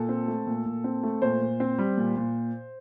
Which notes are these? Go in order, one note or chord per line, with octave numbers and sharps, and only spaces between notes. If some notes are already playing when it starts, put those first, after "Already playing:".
Already playing: A#2 A4
C4
A3
A#2
A#2
C4
A3
A#2 C5
A#2
C4
G3
A#2
A#2